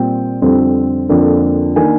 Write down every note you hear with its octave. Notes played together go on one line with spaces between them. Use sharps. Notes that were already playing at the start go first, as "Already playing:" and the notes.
Already playing: A#2 G3 C4 G5
F2 D3 G3 C4
F2 D3 F3 A#3 D4
D#3 A#3 D4 G#5